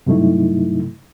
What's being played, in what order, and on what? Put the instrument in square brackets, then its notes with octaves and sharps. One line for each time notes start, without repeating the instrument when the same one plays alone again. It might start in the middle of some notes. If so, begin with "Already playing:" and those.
[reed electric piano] G2 C3 F#3 A3 D#4 E4